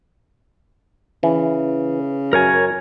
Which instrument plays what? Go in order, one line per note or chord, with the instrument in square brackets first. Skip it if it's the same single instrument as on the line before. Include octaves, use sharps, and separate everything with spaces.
[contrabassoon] C#3 [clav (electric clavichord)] E3
[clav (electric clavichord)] F#2 [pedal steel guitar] A#4 C#5 G#5